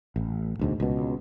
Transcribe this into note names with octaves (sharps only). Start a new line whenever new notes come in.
A1
E1 D2 G#2
C#2 B2